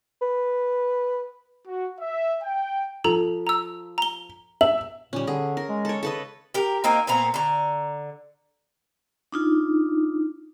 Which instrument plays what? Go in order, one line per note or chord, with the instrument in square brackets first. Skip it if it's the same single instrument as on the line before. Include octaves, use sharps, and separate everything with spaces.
[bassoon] B4
[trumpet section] F#4
E5
G5
[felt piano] F3 [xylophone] A4 A#5
[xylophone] A#5 E6
A#5 G7
[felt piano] E5 [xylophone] F#7
[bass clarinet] A#2 [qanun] G3 C#4
[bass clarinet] D3 [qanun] G#4
[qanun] A#4
[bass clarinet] G#3
[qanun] A4 C#5
[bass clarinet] C#3 [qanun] A4 B4 D#5
[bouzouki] G4 A#4
A#3 C4 D#4 A#4
A#2 B3 C4 A#5
D3 A#5
[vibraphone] D4 D#4 F4